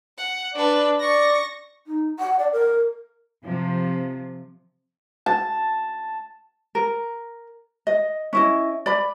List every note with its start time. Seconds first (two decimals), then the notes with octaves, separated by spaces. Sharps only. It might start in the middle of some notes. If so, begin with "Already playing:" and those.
0.17 F#5
0.54 D4 B4 D5
1.00 D5 C#6 A#6
1.87 D#4
2.19 F#5
2.39 D5
2.53 A#4
3.43 C3 F3
5.26 A5
6.75 A#4
7.87 D#5
8.33 C#4 E4 D#5
8.86 D5 B5